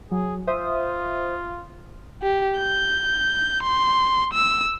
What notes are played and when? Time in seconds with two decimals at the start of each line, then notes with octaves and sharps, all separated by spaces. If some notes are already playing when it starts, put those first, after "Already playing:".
0.11 F#3 G#4
0.47 F4 C5 E5 D#6
2.23 G4
2.59 G6
3.63 C6
4.33 E6